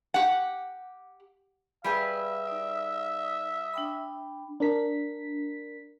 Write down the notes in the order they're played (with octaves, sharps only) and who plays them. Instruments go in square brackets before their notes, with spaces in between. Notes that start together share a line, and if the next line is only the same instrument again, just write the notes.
[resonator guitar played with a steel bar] G4 F#5
[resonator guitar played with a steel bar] G3 G#4 B4 [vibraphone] D5 F5 [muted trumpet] E5
[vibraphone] D#4 D5
D4 G5 B5
[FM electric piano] D4 A#4 B6